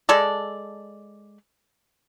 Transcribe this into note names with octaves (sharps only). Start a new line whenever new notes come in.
G#3 A4 D5